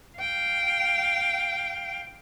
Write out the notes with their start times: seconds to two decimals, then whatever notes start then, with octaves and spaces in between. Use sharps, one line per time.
0.18 F5 G5